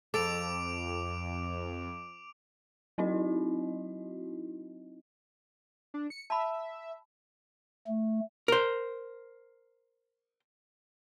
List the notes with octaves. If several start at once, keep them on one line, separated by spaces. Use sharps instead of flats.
F2 A4 D6 D7 F7
F#3 C4 D#4 E4 F#4 D#5
D4
C#7
E5 A5 B5
A3
A#4 C5